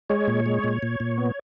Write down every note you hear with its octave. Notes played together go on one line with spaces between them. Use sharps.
G#3 C#5
A#2
G#3
A#2
A#2
A#2
B3